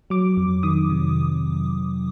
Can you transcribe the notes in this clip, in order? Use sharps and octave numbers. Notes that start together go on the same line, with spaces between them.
F#3 D6
F2
D#3 D#6
C3